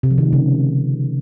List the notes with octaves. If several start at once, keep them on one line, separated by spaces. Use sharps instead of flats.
C3
F3
D#3
A3
C#3